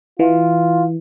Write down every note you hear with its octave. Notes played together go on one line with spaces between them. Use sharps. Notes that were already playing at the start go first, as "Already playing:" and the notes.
E3 F4